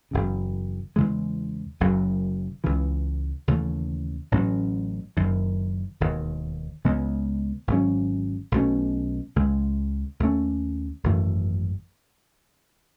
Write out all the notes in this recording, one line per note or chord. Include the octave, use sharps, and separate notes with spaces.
F#1 E2 C#3
E2 C#3 E3 G#3
F#1 F#2 C#3 F#3
C#2 C#3 E3
D#2 C#3 E3 A3
A1 A2 F#3 C#4
F#1 F#2 D#3
E1 D#2 D#3
C#2 C#3 G#3 B3
G#1 G#2 F#3 C#4
B1 B2 A3 C#4
C#2 C#3 G#3
D#2 D#3 A3 C#4
G#1 F#2 E3 A3